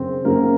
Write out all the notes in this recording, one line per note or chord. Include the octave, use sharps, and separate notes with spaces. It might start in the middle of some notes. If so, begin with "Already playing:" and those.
Already playing: F#2 C#3 C4 C5
F#2 C#3 A#3 A#4